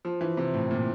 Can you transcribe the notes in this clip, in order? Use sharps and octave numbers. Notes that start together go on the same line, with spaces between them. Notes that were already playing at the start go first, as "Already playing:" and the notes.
F3
E3
C3
A2
A#2